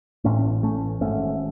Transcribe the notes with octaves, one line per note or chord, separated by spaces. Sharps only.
A1 A2 A3 C#4
A3 C#4
G#1 G#2 A3 C#4